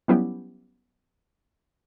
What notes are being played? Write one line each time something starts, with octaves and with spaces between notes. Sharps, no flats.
F#3 G3 B3 C#4 E4 G4